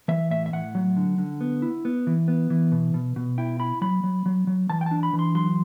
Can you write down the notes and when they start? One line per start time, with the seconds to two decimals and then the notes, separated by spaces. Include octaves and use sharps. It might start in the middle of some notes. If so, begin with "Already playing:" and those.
0.08 E3 E5
0.31 A2 E5
0.46 E5
0.53 A2 F#5
0.75 F#3
0.97 D3
1.18 D3
1.41 B3
1.62 E4
1.85 B3
2.07 E3
2.28 B3
2.50 E3
2.72 B2
2.94 B2
3.16 B2
3.38 E4 G5
3.60 E4 B5
3.81 F#3 B5
4.04 F#3
4.26 F#3
4.47 F#3
4.70 E3 A5
4.81 G5
4.86 D4 A5
5.03 B5
5.13 E3
5.19 C6
5.35 F#3 C6